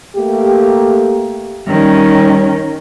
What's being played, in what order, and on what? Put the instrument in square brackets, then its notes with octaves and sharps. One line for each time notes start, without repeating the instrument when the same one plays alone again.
[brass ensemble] A3 A#3 G4
[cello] D#3 C#4 [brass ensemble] G3